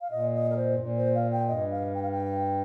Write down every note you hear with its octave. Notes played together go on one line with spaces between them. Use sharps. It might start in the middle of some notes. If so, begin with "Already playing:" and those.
F5
A#2 D#5
D#5
A#4
C5
G2
A#2
C5
F5
G5
G2 D#5
F5
G5
F5
G5